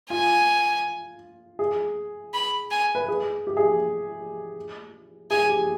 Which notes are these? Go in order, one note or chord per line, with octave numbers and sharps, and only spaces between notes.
F4 G#5
G#4
B5
G#5
B4
G#4
G4
G#4
G#4 G#5
G4